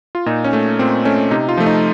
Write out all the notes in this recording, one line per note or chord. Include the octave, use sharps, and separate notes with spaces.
F4
A#2 D#4
C#4
A3
A#2 C4
A3 C#4
C3 D#4
F4
F3 A3
D#4